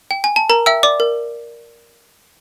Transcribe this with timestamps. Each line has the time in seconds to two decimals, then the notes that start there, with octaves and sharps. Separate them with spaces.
0.11 G5
0.24 G#5
0.36 A5
0.50 A#4 A#5
0.66 E5 G5 E6
0.83 D5 D6
1.00 A#4